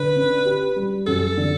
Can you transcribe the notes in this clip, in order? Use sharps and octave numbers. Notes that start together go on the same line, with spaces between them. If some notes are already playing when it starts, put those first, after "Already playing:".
Already playing: D3 B4
C#4
G4
G3
F#2 A4
D3